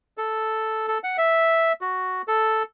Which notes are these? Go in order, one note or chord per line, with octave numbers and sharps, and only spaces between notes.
A4
A4
F#5
E5
F#4
A4